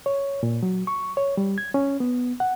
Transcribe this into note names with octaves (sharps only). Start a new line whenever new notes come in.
C#5
A#2
F#3
C#6
C#5
G3
G#6
C#4
B3
F#5